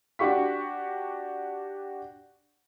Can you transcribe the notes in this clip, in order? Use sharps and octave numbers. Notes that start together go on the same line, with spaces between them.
D4 F#4 G4 C#6 B6